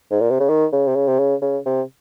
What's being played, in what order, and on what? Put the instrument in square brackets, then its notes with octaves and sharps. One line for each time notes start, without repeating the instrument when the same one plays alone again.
[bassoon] G#2
A#2
C3
C#3
D#3
C#3
C3
C#3
C3
C#3
C#3
C3